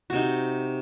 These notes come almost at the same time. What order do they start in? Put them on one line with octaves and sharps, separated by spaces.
F#4 C3 D#4